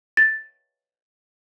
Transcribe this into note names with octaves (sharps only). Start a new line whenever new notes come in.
A6